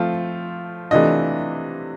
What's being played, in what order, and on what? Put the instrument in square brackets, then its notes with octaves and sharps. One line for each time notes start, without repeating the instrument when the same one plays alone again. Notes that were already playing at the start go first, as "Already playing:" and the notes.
Already playing: [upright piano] F3 A3 C4 F4
C3 E3 A3 D4 F4 D#5